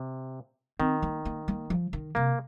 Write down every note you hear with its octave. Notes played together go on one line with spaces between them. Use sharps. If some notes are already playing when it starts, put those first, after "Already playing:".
Already playing: C3
D#3 C4
A#3
A#3
A#3
F3
D#3
C3 A#3